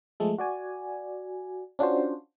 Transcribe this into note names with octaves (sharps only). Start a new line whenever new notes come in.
F3 G#3 A3 G#4 A4
F#4 D5 G#5
C#4 D4 F4 F#4 C5